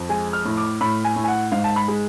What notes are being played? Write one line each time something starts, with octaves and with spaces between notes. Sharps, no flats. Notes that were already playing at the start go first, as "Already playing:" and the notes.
Already playing: F2
G#3 G#5
F6
A2
D6
A2 B5
G#5
A2
G#5
F#5
G#2 F5
A5
B5
G#3